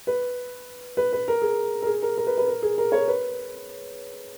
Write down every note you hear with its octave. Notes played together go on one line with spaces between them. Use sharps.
B4
B4
B4
A#4
G#4
A#4
G#4
A#4
A#4
B4
B4
A#4
G#4
A#4
C#5
B4